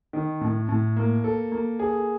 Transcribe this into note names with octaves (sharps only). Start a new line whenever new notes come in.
D#3
A2
A2
A#3
A4
A#3
G#4